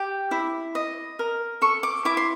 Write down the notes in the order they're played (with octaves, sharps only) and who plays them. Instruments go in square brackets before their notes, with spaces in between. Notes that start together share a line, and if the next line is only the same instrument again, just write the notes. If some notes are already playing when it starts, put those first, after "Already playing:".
Already playing: [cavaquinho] G4 D6
E4
D#5
A#4
A4 C#6
D6
E4 D6
C6